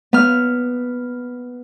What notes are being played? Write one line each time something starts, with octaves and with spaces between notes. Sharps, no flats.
B3 F6